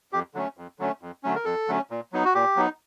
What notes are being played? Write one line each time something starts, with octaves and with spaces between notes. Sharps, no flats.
F2 G4
D3 F#3 A3 C#4
F2
D3 F#3 A3 C#4
F2
D3 F#3 A3 C#4
A#4
F2 A4
D3 F#3 A3 C#4
A#2
F#3 B3 D#4
F#4
A#2 G4
F#3 B3 D#4